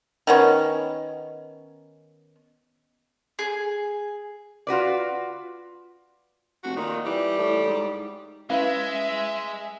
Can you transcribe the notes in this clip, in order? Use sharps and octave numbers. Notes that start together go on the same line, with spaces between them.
D#3 B3 C#4
G#4
F4 F#4 B4 D5
F1 F#4
A#2 D#3
E3 G3
A2
G#2
G#3 C#4 E4 B4 E5 F5